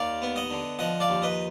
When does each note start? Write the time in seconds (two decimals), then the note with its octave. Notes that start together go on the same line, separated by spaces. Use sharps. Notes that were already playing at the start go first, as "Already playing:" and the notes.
Already playing: D#2 D5 F5
0.22 B3
0.36 D#5 F#5
0.51 D3
0.79 F3 D#5 F#5
1.00 D5 F5
1.09 D#2
1.22 B4 D#5